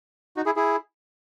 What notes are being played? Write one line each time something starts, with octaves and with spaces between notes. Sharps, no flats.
D#4 F#4
E4 G#4
E4 G#4